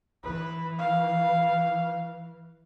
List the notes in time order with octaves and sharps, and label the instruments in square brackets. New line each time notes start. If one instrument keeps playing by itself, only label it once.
[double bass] E3 [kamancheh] B4
[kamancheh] F5